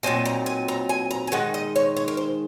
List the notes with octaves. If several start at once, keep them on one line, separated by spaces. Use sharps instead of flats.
A#2 F#3 C4 D#4 G#5
A#5
G#5
A#5
G#5
A#5
G#5
D#3 G#3 D#4 F#5
D#5
C#5
C#5
A#4
C5